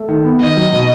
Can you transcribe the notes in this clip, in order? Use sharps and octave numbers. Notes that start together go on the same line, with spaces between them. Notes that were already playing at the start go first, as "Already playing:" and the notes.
Already playing: A3
D#3
B3
D#3 D#5
F#3
B2